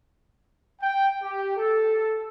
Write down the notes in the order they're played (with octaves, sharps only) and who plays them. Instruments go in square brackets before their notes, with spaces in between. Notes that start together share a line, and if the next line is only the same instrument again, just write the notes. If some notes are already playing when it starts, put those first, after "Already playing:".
[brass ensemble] G5
G4
A4